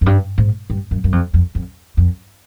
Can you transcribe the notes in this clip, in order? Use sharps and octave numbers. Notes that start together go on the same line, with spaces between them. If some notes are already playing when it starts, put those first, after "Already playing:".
F#2
G2
G#2
G2
F#2
F#2
F2
F2
F2
F2